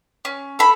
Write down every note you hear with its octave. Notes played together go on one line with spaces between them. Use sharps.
C#4
A4 B5